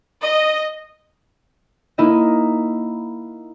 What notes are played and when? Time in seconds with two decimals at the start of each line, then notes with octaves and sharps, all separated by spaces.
0.22 D#5
1.98 A#3 D#4 E4 D#5